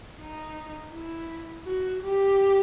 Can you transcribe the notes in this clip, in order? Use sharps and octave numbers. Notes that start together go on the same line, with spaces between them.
D#4
E4
F#4
G4